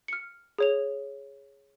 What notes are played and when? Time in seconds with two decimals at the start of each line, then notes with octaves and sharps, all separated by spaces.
0.08 F6 C#7
0.58 G#4 C#5 F7